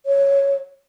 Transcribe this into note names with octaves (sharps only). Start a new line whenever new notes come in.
C#5